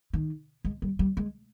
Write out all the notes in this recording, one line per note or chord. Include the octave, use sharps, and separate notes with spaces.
D#3
G#3
G3
G3
G#3